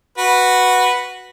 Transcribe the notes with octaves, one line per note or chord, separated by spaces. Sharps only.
F#4 B4